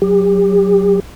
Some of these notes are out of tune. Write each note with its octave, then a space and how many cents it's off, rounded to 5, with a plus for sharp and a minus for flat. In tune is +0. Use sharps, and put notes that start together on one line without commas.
F#3 +0 G4 +35